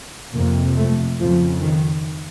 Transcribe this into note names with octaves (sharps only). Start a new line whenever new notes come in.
F2 C3 A#3
A3
F2 C#3 F3
D#3